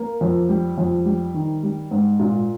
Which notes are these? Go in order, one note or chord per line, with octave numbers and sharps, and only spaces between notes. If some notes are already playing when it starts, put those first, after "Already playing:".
Already playing: A#3
F2
G3
F2
G3
D#3
G3
G#2
A#2